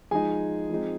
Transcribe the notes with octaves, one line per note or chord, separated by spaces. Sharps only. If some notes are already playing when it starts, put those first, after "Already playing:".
F3 G#3 D#4 G#4 G#5
F3 G#3 C4 D#4